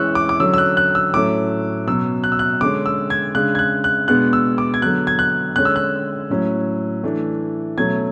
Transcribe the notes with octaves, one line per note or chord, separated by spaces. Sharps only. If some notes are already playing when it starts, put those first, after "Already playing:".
Already playing: E3 G#3 C#4 C#6 E6 F#6
D6
D6
D3 F#3 C#4 E6
E6
F#6
F#6
E6
A2 F#3 A3 C#4 D6
B2 F#3 C#4 E6
F#6
E6
F#6
D3 G#3 C#4 D6
E6
G#6
C#3 G#3 D4 F#6
G#6
F#6
F#6
B2 G#3 B3 D4 F#6
E6
D6
G#6
D3 F#3 B3 F#6
G#6
F#6
D3 G#3 C#4 F#6
E6
F#6
A2 F#3 C#4
E3 A3 D4
B2 F#3 A3 C#4 G#6